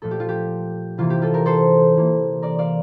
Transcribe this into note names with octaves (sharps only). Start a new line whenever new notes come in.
A#2 F3 A3 A4
G4
F4
G4
C3 E3 A#3 F4
G4
F4 A4
G4 A#4
A4 C5
C3 E3 A#3
A#4 D5
D5 F5